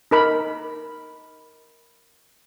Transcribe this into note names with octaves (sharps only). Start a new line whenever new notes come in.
D#4 A#4 B5